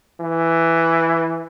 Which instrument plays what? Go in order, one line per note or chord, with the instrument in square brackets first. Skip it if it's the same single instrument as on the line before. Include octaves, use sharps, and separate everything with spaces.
[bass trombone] E3